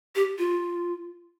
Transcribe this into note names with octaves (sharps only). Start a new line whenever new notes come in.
G4
F4